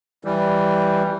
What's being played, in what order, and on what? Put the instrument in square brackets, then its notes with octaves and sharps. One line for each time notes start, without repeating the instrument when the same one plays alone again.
[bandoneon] E3 G3